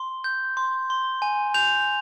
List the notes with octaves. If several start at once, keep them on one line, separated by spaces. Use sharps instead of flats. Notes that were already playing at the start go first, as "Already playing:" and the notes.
Already playing: C6
G6
C6
C6
G#5
G6 F7